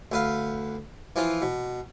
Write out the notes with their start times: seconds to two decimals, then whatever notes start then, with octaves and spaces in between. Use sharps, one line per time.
0.12 D2 B4 F5
1.16 E3 F3 F4
1.42 B2